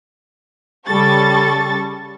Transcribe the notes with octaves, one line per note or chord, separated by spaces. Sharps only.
C#3 G3 A4 C#6 A6